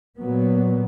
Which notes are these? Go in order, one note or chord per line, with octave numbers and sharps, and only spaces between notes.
A#2 F#3 B3